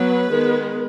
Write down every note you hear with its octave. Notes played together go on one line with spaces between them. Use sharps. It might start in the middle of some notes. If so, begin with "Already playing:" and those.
Already playing: F#3 B3 B4
D#3 G#3 B3